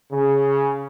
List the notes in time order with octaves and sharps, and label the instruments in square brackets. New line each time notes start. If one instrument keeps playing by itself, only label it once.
[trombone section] C#3